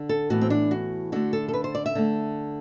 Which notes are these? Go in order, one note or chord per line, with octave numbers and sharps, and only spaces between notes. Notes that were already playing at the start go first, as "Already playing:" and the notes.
Already playing: D3
A4
A2 E3 B3 F#4
C4
D4
F#4
D3 A3 F#4
A4
A4
B4
C5
D5
E5
D3 A3